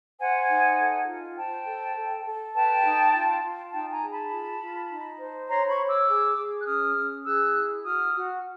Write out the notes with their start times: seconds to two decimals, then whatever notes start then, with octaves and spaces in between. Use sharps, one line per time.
0.19 C5 F#5 G#5
0.49 D#4
0.78 A4
1.07 F4
1.36 C5 G5 A5
1.66 A4
1.96 A4
2.25 A4
2.54 B4 G5 A5
2.84 D#4
3.13 F4
3.43 F4
3.72 D#4 G5 A5
3.91 G#5 A#5
4.01 G#4
4.12 A5 B5
4.31 F4
4.60 F4
4.89 D#4
5.19 C5
5.49 C#5 A#5 C6
5.68 B5 C#6
5.78 C#5
5.88 D6 E6
6.07 G#4
6.37 G#4
6.59 F#6
6.66 C#4 D#6 F6
6.96 C#4
7.25 G#4 E6 F#6
7.54 E4
7.84 F#4 D#6 F6
8.14 F#4